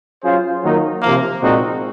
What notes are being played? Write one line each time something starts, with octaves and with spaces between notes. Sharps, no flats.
F#3 C#4 F4 G#4 C5
D#3 F#3 A#3 D#4
C3 F3 A#3
A#2 G#3 C4 D#4 F#4